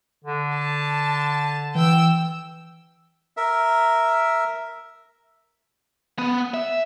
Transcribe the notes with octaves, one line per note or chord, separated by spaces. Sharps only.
D3
A5
E3 G5 E6
A#4 E5
B3
E5